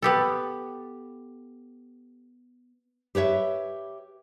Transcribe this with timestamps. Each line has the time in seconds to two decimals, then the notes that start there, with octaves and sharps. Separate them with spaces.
0.02 B3 G4 A4
3.15 G4 B4 C#5 E5